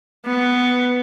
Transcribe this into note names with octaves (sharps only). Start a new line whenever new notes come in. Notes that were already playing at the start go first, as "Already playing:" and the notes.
B3